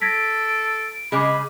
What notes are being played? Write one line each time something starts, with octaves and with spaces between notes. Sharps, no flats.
A4 G#6 A#6 B6 D7
C#3 G#3 D#5 B5 D6